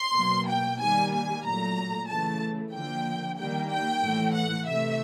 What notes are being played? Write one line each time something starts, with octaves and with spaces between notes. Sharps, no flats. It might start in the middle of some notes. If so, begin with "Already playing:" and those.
Already playing: C6
B2 F#3 A#3
G5
D#3 G3 A#3 G#5
G#5
A#2 F#3 A3 A#5
C#3 E3 A3 A5
D3 F3 A#3 G5
D#3 G3 A#3 G5
G5
A2 E3 A3
F#5
C3 E3 A3 E5